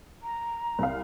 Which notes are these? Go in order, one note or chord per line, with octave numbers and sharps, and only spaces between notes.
A#5
C2 F5